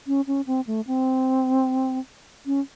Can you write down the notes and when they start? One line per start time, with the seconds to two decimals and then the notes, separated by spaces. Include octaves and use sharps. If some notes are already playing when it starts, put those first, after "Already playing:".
0.07 C#4
0.27 C#4
0.47 C4
0.67 A3
0.87 C4
2.46 C#4